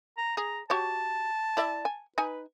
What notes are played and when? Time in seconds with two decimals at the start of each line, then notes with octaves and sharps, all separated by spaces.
0.18 A#5
0.37 G#4 A#5
0.70 F#4 G4 C#5 A5
1.57 E4 D5 E5
1.85 G#5
2.18 D#4 B4 G#5